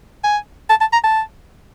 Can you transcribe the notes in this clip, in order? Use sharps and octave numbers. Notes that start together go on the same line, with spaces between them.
G#5
A5
A5
A#5
A5